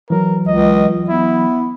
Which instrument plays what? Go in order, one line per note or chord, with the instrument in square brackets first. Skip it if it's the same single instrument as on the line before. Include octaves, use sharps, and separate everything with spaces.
[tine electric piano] E3 F#3 [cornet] A#4
[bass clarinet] C#2 [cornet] D#5
[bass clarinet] B3 [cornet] E4